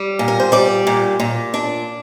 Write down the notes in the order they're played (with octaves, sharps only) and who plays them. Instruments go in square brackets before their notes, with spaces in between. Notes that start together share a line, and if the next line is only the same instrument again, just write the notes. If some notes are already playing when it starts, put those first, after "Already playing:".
Already playing: [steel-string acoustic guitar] G3
A#2
A#4
C5
G3 D5
A#2
A#2
D4